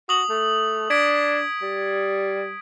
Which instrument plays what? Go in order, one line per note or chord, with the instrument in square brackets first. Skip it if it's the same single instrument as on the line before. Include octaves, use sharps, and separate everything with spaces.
[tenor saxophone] F#4 [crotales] D#6 F#7
[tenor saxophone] A3
[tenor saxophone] D4 [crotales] G#6 B6 D7
[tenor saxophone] G3